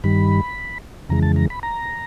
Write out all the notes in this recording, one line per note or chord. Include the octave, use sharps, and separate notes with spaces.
G2 D#3 G3 B5
F2 C#3 E3 G#3 A#5
A5
A#5
B5
A#5